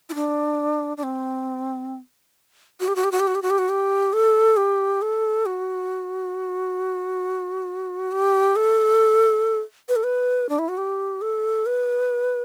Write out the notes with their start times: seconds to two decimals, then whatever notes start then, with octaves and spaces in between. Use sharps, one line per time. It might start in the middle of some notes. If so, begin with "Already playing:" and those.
0.09 E4
0.15 D4
0.97 D4
1.03 C4
2.80 F#4
2.88 G4
2.96 F#4
3.04 G4
3.12 F#4
3.20 G4
3.27 F#4
3.35 G4
3.42 F#4
3.50 G4
3.58 F#4
3.69 G4
4.13 A4
4.57 G4
5.02 A4
5.46 F#4
8.12 G4
8.56 A4
9.89 B4
9.96 A4
10.03 B4
10.49 D4
10.59 E4
10.68 F#4
10.78 G4
11.21 A4
11.66 B4